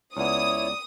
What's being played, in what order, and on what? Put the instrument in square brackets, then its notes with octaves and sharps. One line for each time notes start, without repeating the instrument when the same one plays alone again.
[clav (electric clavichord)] C#2 B3 [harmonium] E4 C#5 [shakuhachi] D5 [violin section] D#6